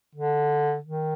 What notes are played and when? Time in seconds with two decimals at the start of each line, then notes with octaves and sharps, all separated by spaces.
0.15 D3
0.84 D#3